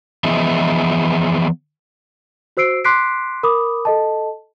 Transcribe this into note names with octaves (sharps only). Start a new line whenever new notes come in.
E3 F3 B3 G#4 D#5 E5
F#4 C5 E6 C7 D7
C6 D6 F#6 B6 C7 D7
A#4 B5 D6 D#6
A4 D#5 A5